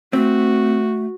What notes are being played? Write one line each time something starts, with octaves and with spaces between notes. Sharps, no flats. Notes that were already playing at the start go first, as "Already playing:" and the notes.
A3 C4 F#4